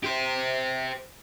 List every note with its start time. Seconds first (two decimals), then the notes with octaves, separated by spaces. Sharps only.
0.04 G4 C5